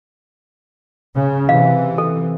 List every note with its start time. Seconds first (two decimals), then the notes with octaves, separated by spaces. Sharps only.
1.16 C#3
1.49 C3 E3 F5
1.98 A4